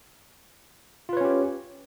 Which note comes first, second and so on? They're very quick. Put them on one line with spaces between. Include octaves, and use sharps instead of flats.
F4 B4 C#5 C#4 G4